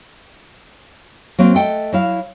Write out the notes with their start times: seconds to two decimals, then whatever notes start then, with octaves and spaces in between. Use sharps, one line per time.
1.39 F#3 A#3 C4
1.55 A3 D#5 F#5 G5
1.92 F#3 E4 F5